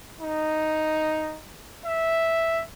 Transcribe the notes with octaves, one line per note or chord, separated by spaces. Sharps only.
D#4
E5